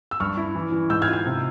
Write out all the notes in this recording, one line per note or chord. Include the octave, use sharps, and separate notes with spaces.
E6
G2 C#6 F6
E4
E3
E3
G#2 E6 G6
F6 G#6
F4
F6 G#6
C3